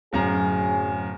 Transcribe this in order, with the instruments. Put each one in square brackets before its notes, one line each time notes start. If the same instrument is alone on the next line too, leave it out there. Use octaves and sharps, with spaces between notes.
[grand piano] D1 F#2 A#5 [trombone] G#4